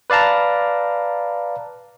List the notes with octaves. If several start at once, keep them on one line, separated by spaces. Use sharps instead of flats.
B4 D5 F5 A5 A#5